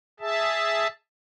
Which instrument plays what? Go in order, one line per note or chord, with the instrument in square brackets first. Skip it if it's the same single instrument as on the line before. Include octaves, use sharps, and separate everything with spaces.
[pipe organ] G#4 E5 A5